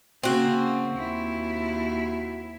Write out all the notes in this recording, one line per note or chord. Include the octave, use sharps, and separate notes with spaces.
C#3 A#3 C4 F#4
D#2 E4